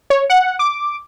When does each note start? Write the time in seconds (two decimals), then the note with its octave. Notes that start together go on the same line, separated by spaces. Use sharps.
0.10 C#5
0.30 F#5
0.59 D6